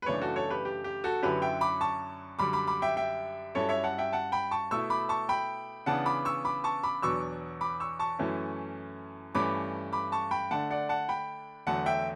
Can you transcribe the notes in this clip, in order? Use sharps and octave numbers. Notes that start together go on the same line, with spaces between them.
B4
F#2 C#3 E3 A3 D4 A4 C#5
F#4 A4
A4 C#5
G4 B4
G4
G4
F#4 A4
F#2 D3 F#3 C#4 E4 G4 B4
E5 G5
B5 D6
A5 C#6
F#2 D3 G3 B5 D6
B5 D6
B5 D6
E5 G5
E5 G5
G2 F#3 C#4 E4 A4 C#5
C#5 E5
F#5 A5
E5 G5
F#5 A5
G5 B5
A5 C#6
B2 A3 E4 C#6 E6
B5 D6
A5 C#6
G5 B5
C#3 E3 B3 D4 F#5 A5
B5 D6
C#6 E6
B5 D6
A5 C#6
B5 D6
E2 B2 F#3 B3 D4 C#6 E6
B5 D6
C#6 E6
A5 C#6
F#2 E3 A3 C#4 E4
G2 E3 A3 C#4 B5 D6
B5 D6
A5 C#6
G5 B5
D3 A3 D4 F#5 A5
D5 F#5
F#5 A5
G5 B5
E2 D3 F#3 A3 F#5 A5
E5 G5